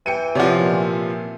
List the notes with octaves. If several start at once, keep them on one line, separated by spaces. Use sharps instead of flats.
E3 G5 C#7 D#7
C3 F3 C#5 D5 F#5
A#2